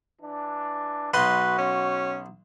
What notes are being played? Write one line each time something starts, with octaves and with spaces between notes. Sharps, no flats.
E3 D4
B1 F#4 B4 D#5 C6
C#4